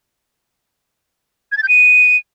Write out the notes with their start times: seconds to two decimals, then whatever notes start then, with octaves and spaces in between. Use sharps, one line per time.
1.52 G#6
1.57 A6
1.63 G6
1.68 D#7